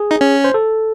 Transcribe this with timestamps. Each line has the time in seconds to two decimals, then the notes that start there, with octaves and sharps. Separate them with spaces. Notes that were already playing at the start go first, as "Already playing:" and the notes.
Already playing: G#4
0.11 D#4
0.21 C#4
0.44 C5
0.54 A4